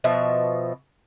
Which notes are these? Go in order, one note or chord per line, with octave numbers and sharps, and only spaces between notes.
B2 F3 E5